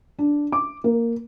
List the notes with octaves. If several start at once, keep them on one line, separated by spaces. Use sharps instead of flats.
D4
D6
A#3